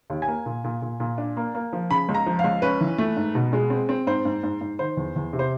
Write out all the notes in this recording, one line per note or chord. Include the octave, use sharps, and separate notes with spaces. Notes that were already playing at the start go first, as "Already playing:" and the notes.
D#2
G#5
A#3
A#2
A#2
A#2
A#2
D4
A#3
A#3
F3
C#3 B5
C#2
A#5
F3
F5
C#2
C#4 B4
E3
A3
G#2
B2
G#3
C4
C4
G#2 C5
G#2
G#2
G#2
D#3 C5
E2
E2
C3
C5